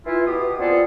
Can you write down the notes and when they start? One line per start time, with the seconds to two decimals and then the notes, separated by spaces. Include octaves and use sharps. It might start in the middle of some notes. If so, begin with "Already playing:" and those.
0.06 E3 E4 F4
0.27 B2 G4 D#6
0.59 B3 C4 F4 G#4 A4 D5